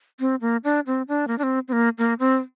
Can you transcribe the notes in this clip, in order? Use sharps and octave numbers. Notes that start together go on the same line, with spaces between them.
C4
A#3
D4
C4
D4
A#3
D4
C4
C4
A#3
A#3
C4